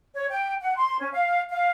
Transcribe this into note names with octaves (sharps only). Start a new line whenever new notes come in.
C#5
G5
F#5
C6
C#4
F5
F5